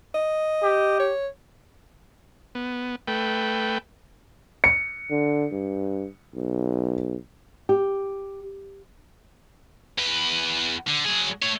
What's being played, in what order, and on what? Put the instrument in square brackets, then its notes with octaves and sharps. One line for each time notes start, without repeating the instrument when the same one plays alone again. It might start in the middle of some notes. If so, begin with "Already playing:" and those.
[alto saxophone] D#5
[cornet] G4
[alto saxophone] C#5
[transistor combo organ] B3
A3 B4 G5
[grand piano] C#7
[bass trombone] D3
G2
B1
[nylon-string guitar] G4
[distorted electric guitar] E2 B4
D3
F#3 G#4
A3 C#5